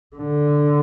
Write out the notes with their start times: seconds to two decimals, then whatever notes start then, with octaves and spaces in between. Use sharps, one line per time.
0.16 D3